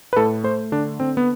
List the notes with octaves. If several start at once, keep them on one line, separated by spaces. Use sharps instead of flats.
B4
A2 A4
A3 C5
D3 D4
D3 C4
B3